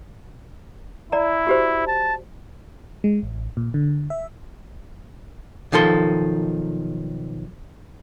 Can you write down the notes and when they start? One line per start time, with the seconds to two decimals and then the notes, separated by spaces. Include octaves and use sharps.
1.12 E4 D5 A#5
1.47 F#4 G4 C5
1.87 A5
3.04 G#3
3.22 A1
3.57 A#2
3.74 D3
4.10 E5
5.72 B1 D#3 F3 A4 C6